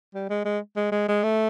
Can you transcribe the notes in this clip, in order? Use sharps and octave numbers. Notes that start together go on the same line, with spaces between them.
G3
G#3
G#3
G#3
G#3
G#3
A3